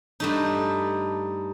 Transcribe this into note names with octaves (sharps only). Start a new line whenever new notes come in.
G2 A3 D#4